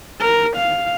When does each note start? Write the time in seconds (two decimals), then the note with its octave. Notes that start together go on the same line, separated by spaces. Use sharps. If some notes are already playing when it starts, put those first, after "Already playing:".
0.20 A#4
0.57 F5